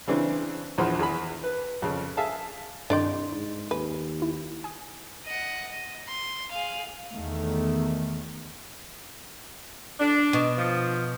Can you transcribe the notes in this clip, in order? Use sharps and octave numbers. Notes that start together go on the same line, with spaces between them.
C#3 E3 C4 D4
A#1 E2 F3 C5 F#5 B5
E2 G#4 B5
B4
F2 C#3
G#4 E5 F5 A5
C2 G2 D#3 D4 D5 D#5 G5 C6
G#2 D#4
D#2 B4 G#5
E4
G#5 D#6
D#5 F#5
D#5
C6
G#4 F5
E2 D#3 A3
D4
B2
F3